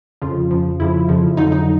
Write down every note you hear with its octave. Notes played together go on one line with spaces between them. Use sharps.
F2 C#3 F3 F4
F2 C#3 F3
F2 C#3 F3 E4
F2 C#3 F3
F2 D3 F#3 D#4
D#4